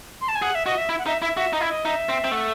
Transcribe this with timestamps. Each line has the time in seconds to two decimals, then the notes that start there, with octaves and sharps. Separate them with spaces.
0.21 C6
0.28 A5
0.35 G#5
0.42 G#4 F#5
0.55 E5
0.66 F#4 D#5
0.78 E5
0.89 E4
0.98 F#5
1.06 D#4 E5
1.22 E4 E5
1.37 F#4 E5
1.53 D#4 D#5
1.61 E4
1.69 D#5
1.85 D#4 E5
2.09 C4
2.24 C4
2.31 A3 F#5